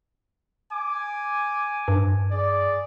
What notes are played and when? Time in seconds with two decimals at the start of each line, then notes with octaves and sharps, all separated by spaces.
0.72 G#5 D6
1.88 G2
2.31 G#4 D5